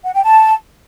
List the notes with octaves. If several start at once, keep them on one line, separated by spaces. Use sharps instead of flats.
F#5
G5
A5